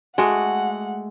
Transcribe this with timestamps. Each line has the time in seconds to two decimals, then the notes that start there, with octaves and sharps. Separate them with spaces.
0.18 G#3 A3 F#4 F#5